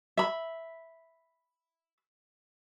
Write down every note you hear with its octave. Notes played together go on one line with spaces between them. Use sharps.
E5 B5